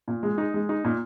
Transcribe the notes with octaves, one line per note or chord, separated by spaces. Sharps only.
A#2
G#3
D#4
G#3
D#4
A#2